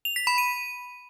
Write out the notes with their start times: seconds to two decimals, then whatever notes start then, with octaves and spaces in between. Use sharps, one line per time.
0.05 F7
0.16 B6
0.27 B5
0.38 D#7